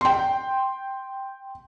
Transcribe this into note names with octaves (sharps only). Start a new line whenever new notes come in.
G5 C6